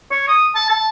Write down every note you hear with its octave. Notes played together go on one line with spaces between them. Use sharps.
C#5
D#6
A5
A5